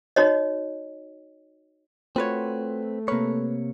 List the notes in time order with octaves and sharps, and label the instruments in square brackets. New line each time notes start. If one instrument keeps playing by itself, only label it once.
[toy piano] D#4 F#4 C#5 D#5
[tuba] A3 [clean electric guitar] C4 B4 [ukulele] F4 F#4 C#5
[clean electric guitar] C3 C#5 [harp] A#3 F6 [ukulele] B4